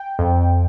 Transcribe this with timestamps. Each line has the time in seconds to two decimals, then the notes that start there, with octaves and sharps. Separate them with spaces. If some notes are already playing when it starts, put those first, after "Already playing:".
Already playing: G5
0.19 F2